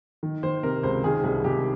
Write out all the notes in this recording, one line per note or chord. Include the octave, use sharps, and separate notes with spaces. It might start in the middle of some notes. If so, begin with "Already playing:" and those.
D#3
D#3 C5
C3 A#4
C#2 C5
D#3 G#4
C2 G#4
C2 G4